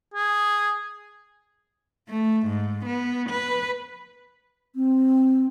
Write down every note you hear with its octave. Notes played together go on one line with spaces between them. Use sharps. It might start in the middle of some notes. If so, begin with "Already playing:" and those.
G#4
A3
G#2
B3
B4
C4